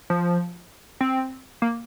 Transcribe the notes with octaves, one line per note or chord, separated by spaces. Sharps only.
F3
C4
A#3